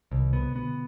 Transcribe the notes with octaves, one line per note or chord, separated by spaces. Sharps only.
C2 C3 D#3
B2 B3
C3
B2 D3 B3